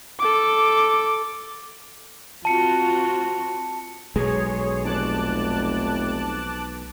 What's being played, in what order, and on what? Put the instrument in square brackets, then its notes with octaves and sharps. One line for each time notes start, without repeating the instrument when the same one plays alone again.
[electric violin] A4 D6
[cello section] C4 F4 F#4 [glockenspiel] A5 C#7
[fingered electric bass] B1 G#3 [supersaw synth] G#4 C#5
[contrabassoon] F1 [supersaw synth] A5 D6 F#6